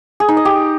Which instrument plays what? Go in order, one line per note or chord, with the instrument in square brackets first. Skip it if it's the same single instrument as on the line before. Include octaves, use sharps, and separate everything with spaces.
[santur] G#4
D#4
D#5
G4